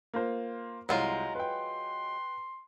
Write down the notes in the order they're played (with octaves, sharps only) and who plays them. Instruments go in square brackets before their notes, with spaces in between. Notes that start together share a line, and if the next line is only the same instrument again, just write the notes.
[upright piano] A#3 F4 C5
[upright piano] C2 [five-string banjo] F#3 G#3 F4 [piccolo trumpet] A#5
[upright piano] B4 G5 [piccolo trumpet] C6